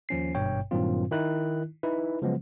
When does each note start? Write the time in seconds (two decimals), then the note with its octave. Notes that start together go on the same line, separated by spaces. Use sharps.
0.09 D#2 F3 C#4 C7
0.35 G#1 G2 B2 C#5 G5
0.71 G2 A#2 D#3 F#3 C4 F4
1.12 D#3 D#4 E4 F#6
1.83 D#4 E4 B4
2.22 C#3 F3 F#3 G#3 B3